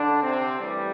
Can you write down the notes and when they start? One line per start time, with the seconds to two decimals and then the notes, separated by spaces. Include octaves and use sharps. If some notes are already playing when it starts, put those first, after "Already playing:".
Already playing: D3 D4
0.23 C3 C4
0.60 A2 E3 G3